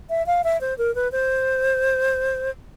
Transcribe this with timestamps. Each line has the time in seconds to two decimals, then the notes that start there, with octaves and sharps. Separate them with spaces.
0.09 E5
0.26 F5
0.44 E5
0.61 C5
0.78 A#4
0.95 B4
1.12 C5